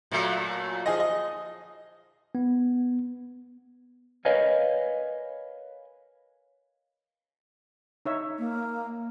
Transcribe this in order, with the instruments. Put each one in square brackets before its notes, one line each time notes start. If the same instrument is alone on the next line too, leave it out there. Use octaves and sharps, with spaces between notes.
[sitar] A#2 F#3 A3
[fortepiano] F3 G#4 D#5
D#5
[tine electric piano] B3
[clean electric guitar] A#4 B4 C#5 D#5 F5 G#5
[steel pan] D#4 C#5 E5
[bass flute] A#3